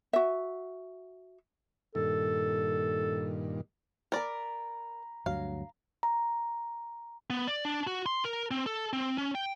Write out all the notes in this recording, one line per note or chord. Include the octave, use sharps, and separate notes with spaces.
F#4 E5
G2 A#2 D#3 A4
A#4 D5 A#5 B5
D2 G2 F#3 F5
A#5
B3
D5
D4
F#4
C6
A#4
C4
A4
C4
C#4
G5